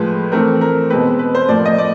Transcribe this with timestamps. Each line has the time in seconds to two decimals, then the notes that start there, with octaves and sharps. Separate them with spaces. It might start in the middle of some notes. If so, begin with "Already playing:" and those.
Already playing: A2 F3 G#3 B4
0.32 E3 A3 C4 A#4
0.61 A#4
0.90 B2 G#3 C4 B4
1.19 B4
1.35 C5
1.48 A2 F3 A#3 D5
1.66 D#5
1.78 D5